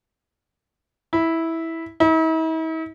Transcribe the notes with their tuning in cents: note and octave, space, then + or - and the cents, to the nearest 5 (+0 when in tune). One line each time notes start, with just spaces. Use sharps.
E4 -10
E4 -45